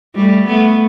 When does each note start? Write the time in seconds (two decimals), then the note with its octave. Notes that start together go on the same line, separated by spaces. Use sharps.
0.15 G3 A3
0.47 A3 B3